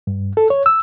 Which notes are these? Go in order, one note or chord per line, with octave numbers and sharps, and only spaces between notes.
G2
A4
C#5
E6